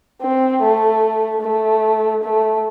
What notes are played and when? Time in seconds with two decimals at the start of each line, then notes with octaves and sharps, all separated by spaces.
0.21 C4
0.62 A3
1.41 A3
2.22 A3